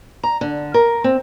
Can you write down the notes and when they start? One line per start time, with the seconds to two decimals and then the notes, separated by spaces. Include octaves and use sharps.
0.23 A#5
0.41 D3
0.74 A#4
1.04 C4